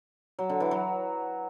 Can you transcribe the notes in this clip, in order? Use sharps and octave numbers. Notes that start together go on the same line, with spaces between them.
F#3
D3
E3
F#3